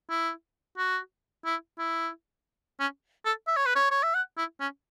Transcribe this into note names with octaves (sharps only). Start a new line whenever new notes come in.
E4
F#4
E4
E4
C#4
A4
E5
C#5
B4
C#5
C#5
E5
F#5
E4
C#4